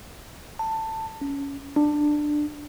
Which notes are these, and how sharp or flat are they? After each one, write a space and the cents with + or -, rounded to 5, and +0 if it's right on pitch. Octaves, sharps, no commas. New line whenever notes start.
A5 +15
C#4 +15
D4 +15